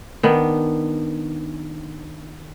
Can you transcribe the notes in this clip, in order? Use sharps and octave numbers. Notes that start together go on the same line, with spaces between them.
D#3 B3 D4